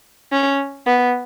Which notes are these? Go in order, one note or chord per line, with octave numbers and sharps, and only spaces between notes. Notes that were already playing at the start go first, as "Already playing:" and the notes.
C#4
B3